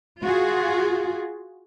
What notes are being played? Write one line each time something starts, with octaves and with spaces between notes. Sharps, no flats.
F4 F#4 G#4